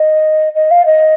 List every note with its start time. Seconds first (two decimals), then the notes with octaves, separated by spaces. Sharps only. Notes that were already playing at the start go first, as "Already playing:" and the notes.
Already playing: D#5
0.54 D#5
0.71 F5
0.85 D#5